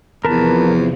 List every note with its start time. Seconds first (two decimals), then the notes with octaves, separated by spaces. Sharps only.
0.25 E2 C3 F3 A#4 B4 A5